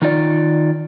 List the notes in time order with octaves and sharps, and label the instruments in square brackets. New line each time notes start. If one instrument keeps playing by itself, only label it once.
[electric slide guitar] D#3 D#4 F4 D5